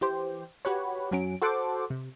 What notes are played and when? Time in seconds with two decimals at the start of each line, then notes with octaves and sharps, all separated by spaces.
0.01 E3 G4 C5
0.65 F#4 G4 B4 C#5
1.11 F#2 F#3 C#4 D7
1.42 F#4 A4 C5 F#5 D6
1.90 C3